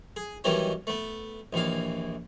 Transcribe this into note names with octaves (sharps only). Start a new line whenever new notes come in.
G#4
D#3 E3 F#3 G3 B3 C#4
A3 B3
A#1 D#2 E3 F5